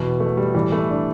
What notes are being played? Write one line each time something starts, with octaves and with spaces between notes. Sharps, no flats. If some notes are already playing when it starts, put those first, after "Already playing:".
Already playing: E2 B2 B3
A3
G3
A2 E3 G3
A3
D4